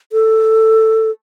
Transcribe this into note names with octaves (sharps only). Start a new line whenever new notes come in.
A4